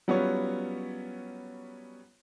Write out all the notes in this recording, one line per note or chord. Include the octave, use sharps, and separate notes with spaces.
F#3 G3 B3 C#4 F4 C#5